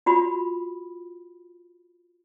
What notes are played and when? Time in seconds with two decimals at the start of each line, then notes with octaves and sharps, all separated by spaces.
0.06 F4 F#4 B5